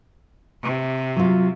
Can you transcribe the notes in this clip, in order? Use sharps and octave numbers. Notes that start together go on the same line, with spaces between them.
C3
F#3 F4